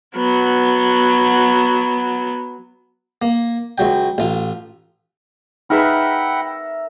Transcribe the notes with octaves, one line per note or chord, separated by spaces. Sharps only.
F#3 B3
A#3
C#2 F#3 G5
A1 F4
D#4 G#4 A#4 B4 E5 F#5 G5 B5